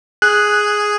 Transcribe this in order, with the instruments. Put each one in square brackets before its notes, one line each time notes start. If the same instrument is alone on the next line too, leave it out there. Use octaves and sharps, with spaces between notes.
[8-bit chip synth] G#4 [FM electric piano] F#6